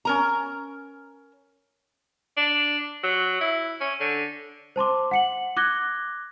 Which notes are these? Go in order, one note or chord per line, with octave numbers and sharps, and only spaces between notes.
C#4 A#4 A#5
D4
F#3
E4
C#4
D3
C5 A5 C6 D6
F#5 C#7 F#7
D6 F#6 G#6 A#6 G7